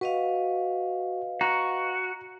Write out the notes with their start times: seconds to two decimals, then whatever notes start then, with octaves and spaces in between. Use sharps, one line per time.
0.01 F#4 B4 D#5 F5
1.41 F#4 A#5